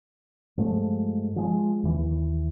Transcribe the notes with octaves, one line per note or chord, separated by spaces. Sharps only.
G2 F3 G#3 A3
F3 G#3
D#2 E3